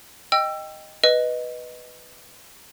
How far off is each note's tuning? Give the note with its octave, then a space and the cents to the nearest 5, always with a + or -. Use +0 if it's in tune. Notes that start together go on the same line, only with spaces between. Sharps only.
D#5 +0 G5 +0 E6 +25
B4 +0 D#5 +0